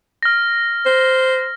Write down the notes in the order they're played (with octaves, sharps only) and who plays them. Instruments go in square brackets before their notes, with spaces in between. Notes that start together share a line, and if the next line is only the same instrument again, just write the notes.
[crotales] F6 A#6
[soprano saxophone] C5